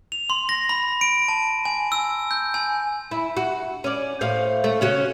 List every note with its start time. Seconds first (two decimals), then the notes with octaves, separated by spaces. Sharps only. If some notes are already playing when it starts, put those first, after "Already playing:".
0.12 F7
0.30 C6
0.49 A#6
0.69 B5
1.01 D7
1.28 A5
1.65 G#5
1.92 E6
2.31 G6
2.54 G#5
3.11 E4
3.37 F#4
3.84 C#4 D5
4.21 A2 C5 F5
4.64 A3
4.81 C#3 C#4 F#4